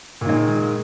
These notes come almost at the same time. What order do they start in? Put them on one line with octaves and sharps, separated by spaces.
A#2 D#3 G#3